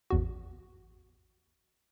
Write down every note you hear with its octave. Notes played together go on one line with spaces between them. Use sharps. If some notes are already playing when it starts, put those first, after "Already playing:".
A1 E2 F#4